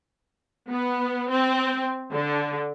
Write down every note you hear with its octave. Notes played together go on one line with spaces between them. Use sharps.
B3
C4
D3